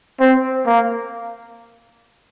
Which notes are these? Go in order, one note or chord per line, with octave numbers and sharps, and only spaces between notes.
C4
A#3